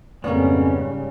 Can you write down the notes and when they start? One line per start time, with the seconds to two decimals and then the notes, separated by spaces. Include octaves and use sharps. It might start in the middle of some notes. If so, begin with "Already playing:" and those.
0.24 F2 G#2 C#3 G3 A#3 B3 C#4